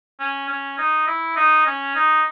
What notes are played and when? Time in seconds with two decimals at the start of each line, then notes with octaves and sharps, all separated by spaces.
0.20 C#4
0.49 C#4
0.79 D#4
1.07 E4
1.37 D#4
1.66 C#4
1.96 D#4